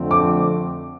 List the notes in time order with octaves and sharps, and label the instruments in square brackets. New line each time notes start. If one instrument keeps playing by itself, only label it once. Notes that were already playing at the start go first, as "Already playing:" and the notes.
Already playing: [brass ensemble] F2 D3 A3 C4
[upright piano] D6